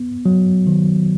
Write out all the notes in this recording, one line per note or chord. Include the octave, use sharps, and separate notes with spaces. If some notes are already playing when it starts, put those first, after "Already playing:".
Already playing: B3
F#3
D#3